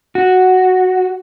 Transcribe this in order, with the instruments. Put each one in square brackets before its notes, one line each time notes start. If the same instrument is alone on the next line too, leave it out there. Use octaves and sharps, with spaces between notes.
[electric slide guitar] F#4